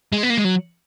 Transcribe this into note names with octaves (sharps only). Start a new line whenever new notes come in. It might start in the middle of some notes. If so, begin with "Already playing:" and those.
G#3
B3
A#3
G#3
F#3